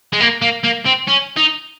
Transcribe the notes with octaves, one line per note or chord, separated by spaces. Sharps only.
G#3
A#3
A#3
A#3
C4
C#4
D#4